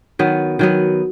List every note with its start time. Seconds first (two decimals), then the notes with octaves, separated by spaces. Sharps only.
0.19 D#3 F#3 B3
0.59 D#3 F#3 B3